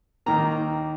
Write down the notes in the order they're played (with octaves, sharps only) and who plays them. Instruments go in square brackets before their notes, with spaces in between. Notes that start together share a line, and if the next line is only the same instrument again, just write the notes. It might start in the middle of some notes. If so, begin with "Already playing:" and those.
[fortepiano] D#2 D#3 A#3 A#5